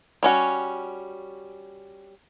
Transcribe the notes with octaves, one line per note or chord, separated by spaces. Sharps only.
G3 C#4 F#4